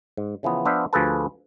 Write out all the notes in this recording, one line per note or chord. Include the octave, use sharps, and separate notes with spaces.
G#2
C#3 E3 F3 B3
F3 B3 D4 C5 E5 F5
D2 F3 G#4 A4 B4 A5